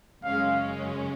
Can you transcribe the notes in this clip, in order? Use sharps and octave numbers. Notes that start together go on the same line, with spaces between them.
F#2 C#3 G#3 C#4 F5